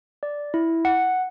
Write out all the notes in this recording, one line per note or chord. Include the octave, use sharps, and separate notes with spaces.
D5
E4
F#5